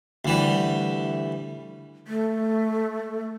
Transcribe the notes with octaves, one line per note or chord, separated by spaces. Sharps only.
D2 E3 G3
A3